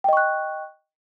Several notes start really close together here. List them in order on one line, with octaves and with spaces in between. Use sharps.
G5 D#5 C#6 F#6